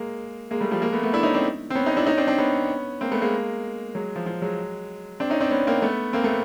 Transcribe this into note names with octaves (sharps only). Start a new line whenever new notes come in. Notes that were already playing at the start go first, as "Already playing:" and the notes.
Already playing: G#3 A#3
G#3 A#3
G3 A3
F3 G3
G#3 A#3
A3 B3
A3 B3
D4 E4
C#4 D#4
C4 D4
C4
B3 C#4
C#4 D#4
D4 E4
C#4 D#4
C4 D4
C4 D4
B3 C#4
A#3 C4
A3 B3
G#3 A#3
F#3 G#3
F3
F3
F#3 G#3
C4 D4
C#4 D#4
C4 D4
B3 C#4
A#3 C4
A3 B3
A#3 C4
A3 B3